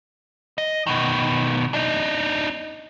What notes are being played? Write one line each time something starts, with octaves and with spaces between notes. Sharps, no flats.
D#5
B2 D#3
D4 D#4